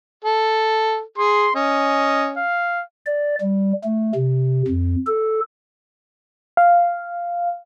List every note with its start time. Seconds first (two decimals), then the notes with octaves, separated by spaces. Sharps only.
0.25 A4
1.18 G#4 C6
1.55 C#4 D#5
2.37 F5
3.06 D5
3.41 G3
3.84 A3
4.15 C3
4.68 F2
5.06 A4
6.57 F5